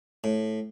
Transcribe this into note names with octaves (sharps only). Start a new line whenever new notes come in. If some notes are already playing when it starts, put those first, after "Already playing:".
A2